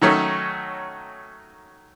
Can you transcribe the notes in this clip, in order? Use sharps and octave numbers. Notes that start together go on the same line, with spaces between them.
D#3 F#3 A3 C#4 D#4